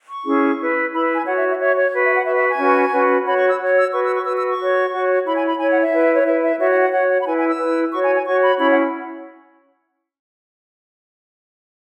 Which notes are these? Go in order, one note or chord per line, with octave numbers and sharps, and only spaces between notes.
C#6
C#4 E4 G#4
E4 B4
E4 B4 B5
G#5
F#4 C#5 F#5
E5
E5
F#4 C#5 E5
C#5
F#4 B4
E5
F#5
F#4 B4 E5
E5
G#5
C#4 F#4 B4
C#4 F#4 B4
F#4 C#5 B5
C#6
E6
F#4 C#5
E6
F#4 B4 C#6
E6
C#6
F#4 B4 E6
E6
C#6
F#4 C#5
F#4 C#5
E4 C#5 B5
G#5
B5
E4 C#5 G#5
F#5
E5
E4 B4
C#5
E4 B4 E5
E5
F#4 C#5 E5
F#5
F#5
F#4 C#5 F#5
F#5
B5
E4 B4 G#5
G#5
E6
E4 B4
F#4 C#5 C#6
G#5
G#5
F#4 C#5 C#6
B5
C#4 E4 C#5 B5
F#5